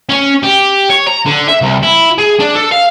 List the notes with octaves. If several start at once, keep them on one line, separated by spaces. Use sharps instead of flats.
C#4
G4
C#5
A#5
D3
E5
C2
E4
G#4
D4
A4
F5